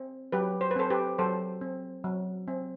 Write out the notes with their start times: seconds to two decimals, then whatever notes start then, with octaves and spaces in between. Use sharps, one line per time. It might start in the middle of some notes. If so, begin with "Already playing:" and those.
Already playing: C4
0.32 F#3 G4 B4
0.61 C5
0.71 B4
0.76 C4 A4 C5
0.90 G4 B4
1.19 F#3 A4 C5
1.61 C4
2.04 F#3
2.47 C4